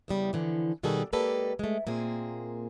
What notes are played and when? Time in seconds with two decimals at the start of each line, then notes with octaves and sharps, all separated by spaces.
0.08 E2 C#3 G3
0.33 D3 E3 F3
0.83 B2 D#3 G3 F#4 G#4 A4
1.13 G#3 A#3 G4 A4 B4 D5
1.59 G#3 A3
1.87 A#2 A#3 C4 G#4